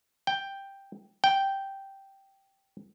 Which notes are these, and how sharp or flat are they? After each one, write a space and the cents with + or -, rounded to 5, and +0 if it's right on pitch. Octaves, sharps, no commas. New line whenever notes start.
G5 +5
G5 -5